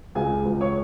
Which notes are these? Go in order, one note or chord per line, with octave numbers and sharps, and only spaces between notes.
C#2 G#4 G#5
C#2
C#5 C#6